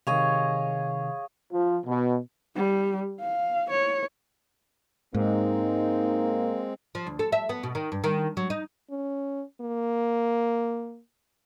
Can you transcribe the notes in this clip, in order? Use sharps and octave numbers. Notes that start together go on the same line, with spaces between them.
C3 D#3 G#4 C#5 D#5 F5
F3
B2
G3
F5
C#5
G#2 G#3 A#3 C4 D#4
F3
D2
A4
E5
B3
B2
D#3
G2
D#3
F#3
D#4
C#4
A#3